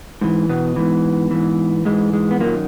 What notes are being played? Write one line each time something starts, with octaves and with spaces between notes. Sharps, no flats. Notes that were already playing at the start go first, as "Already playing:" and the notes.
G#2 E3
B2 B3
G#2 E3
G#2 E3
G#2 E3 G#3
G#3
B3
F#2 A#2 D#3 F#3 A#3